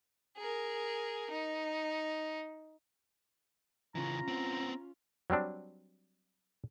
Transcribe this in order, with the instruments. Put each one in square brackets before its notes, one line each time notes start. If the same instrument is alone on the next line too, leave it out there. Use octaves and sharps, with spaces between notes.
[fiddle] G#4 A#4
D#4
[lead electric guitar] C#3 E3 [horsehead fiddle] C#4 F4 [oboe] A#5
[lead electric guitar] B3 C4
[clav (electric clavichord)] F#3 G3 C4 D4